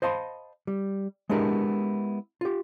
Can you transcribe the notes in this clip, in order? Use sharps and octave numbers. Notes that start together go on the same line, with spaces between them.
C5 D#5 F5 A5 B5 C6
G3
G#3 B3 D4 E4 G4 A#4
F4 G4